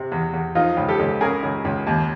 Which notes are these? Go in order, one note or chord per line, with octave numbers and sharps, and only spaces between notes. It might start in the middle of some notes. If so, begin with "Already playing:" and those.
Already playing: C3
E2
E2
F3 D#4 F4
C#2
G4 A4
C#2
C#3 G#4 A#4
C#2
C#2
D#2